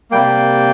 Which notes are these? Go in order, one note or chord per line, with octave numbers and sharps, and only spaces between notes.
C3 G3 A#3 G5